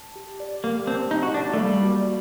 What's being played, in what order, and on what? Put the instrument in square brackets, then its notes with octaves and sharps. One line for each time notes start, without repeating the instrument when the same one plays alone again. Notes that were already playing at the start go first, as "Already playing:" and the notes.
Already playing: [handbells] A5
G4
D5
[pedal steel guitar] A#3 [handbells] G4
[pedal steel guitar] C4 [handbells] A5
[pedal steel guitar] D#4 [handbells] G4
[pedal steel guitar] F#4
[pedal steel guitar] D4 [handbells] D5
[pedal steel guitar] A3
[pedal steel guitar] G3 [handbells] A#3
[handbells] F#4